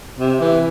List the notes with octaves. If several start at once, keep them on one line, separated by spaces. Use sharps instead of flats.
C3
E3